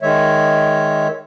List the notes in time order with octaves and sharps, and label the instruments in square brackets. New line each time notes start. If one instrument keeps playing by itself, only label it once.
[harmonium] D#3 G#3 C#5 E5